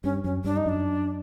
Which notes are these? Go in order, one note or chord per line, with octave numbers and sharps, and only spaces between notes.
G2 C#4
F#2 C#4
G2 D4
D#4
F#2 D4